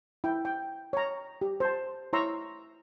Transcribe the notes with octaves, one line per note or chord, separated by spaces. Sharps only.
E4 G5
G5
C#5 A#5
G4
C5 A5
E4 C#5 A#5 C6 C#6 E6